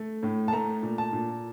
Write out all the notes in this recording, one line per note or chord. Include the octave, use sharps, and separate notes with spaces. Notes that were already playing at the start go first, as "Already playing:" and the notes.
Already playing: A3
A2
A5
A3 A#5
A#2
A5
A#2